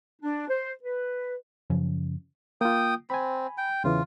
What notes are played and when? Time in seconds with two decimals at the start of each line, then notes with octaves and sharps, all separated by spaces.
0.22 D4
0.49 C5
0.83 B4
1.70 F#2 C#3 F3 C#4
2.61 A#3 F4 G5 D#6
3.10 C4 G#5 B5
3.58 G5
3.84 E2 C#3 E3 F4